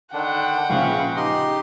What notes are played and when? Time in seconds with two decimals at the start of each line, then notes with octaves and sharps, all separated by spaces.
0.13 D3 D#3 D4 F#5 G5
0.70 A#1 C#3 F4 B4 F5 C#6
1.16 D#4 G4 D#5 C6